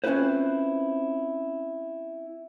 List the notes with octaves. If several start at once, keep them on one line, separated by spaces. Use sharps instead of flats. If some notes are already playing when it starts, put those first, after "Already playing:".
C4 C#4 E4 F4 B4 C5